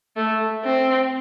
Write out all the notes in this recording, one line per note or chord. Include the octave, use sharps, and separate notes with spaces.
A3
C4